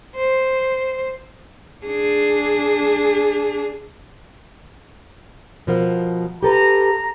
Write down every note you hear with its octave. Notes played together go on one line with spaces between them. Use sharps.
C5
D4 G#4
B2 F3 A#4
G4 A4 B4 A#5